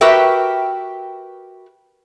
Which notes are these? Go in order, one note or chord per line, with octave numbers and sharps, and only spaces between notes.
F#4 G4 A#4 B4 E5 G5